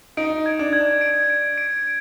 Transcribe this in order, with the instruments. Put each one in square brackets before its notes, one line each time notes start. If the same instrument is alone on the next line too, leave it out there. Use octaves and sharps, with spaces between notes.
[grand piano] D#4 [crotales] D7
[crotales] G#6
[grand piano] D4
[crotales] G#6
D7
D7
D7